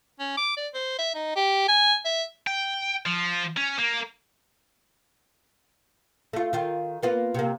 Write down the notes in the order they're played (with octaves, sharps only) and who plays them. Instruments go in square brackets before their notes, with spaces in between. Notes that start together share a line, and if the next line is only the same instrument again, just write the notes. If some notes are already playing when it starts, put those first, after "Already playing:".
[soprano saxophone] C#4
D6
D5
C5
E5
D#4
G4
G#5
E5
[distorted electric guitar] G5
F3
C#4
A#3
[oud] A3 F4
D#3 F4
A#3 B3 F4
C3 A#3